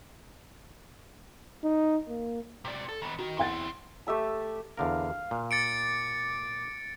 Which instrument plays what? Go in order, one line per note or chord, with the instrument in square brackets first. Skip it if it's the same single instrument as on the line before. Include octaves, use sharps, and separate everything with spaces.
[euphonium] D#4
A#3
[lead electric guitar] C3 D5
A4
D#3 B3
[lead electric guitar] D#3 [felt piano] F#4
[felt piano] E2 F#5 A6 [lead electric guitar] C4 E4
[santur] A3 G4 E5 A5
[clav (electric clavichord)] E2 D3 A#4 [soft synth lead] F5
[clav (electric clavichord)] A#2
[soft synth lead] D6 [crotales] A6 C#7 D7